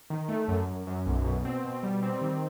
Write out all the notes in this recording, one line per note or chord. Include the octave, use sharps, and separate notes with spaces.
D#3
A3
F#2
F#2
F#2
B1
B2
C4
B2
G3
C4
D#3